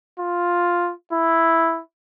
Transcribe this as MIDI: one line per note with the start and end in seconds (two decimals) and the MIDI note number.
0.20 0.92 65
1.12 1.80 64